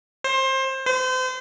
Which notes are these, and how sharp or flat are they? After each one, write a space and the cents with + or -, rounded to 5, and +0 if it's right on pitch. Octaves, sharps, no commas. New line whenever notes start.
C5 +25
C5 -35